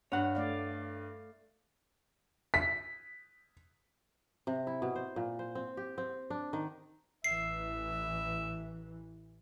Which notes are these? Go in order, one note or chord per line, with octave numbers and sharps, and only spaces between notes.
G2 C#5 F#5
A3 D5 F5
B6
C3
E4
B2
C5
A#2
C5
C4
G4
C4
D4
D#3
A1 E3 E5 C7